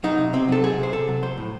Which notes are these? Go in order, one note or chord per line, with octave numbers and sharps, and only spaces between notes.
F#3 D#4
C3
C3 C4
F#3 A4
F#3 G#4
C3 C5
C3 A4
F#3
F#3 C5
A2